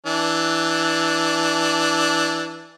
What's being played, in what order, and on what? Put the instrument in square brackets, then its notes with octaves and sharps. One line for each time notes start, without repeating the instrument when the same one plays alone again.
[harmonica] E3 D4